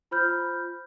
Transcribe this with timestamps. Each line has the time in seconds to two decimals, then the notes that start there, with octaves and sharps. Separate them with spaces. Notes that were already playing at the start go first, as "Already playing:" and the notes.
0.11 F4 C5 B5 F6 G6